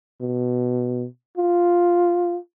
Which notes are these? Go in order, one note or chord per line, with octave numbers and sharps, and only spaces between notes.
B2
F4